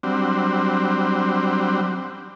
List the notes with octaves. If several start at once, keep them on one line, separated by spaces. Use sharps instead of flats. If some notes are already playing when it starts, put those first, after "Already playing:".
F#3 G3 C4 D4